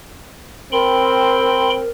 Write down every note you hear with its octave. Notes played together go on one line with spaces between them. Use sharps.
C4 A#4 G5 B5 C6